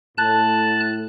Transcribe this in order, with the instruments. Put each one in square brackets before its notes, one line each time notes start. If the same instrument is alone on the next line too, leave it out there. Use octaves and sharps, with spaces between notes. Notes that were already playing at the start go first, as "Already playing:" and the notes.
[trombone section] A2 [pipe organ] A5 F#6